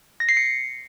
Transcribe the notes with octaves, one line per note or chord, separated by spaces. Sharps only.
A#6
C7
C#7